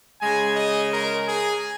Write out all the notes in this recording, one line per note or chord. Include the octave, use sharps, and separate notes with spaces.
C#3 G#3 G#5
D#5
A#4
G#4